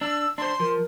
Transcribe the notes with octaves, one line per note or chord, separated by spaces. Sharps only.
D4 E6
D4 C5 C6
F3 A#4